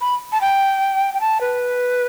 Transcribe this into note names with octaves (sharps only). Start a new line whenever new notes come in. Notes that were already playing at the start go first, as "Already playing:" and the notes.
B5
A5
G5
G5
A5
B4